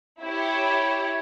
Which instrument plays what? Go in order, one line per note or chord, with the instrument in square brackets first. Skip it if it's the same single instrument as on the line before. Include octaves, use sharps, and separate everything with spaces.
[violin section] E4 G4 C#5